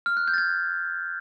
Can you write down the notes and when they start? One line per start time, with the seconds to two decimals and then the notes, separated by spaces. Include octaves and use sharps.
0.06 F6
0.17 F#6
0.28 G6
0.34 A6
0.38 G#6